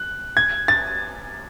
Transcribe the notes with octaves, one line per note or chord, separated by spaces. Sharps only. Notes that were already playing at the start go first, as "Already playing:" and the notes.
Already playing: F#6
G#6
A6